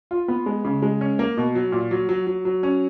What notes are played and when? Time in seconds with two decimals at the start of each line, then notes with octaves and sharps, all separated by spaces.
0.11 F4
0.28 B3
0.46 G#3
0.65 C#3
0.82 G#3
1.01 C#4
1.19 A#3
1.37 B2
1.55 F#3
1.72 A#2
1.91 F#3
2.09 F#3
2.27 F#3
2.45 F#3
2.63 C#4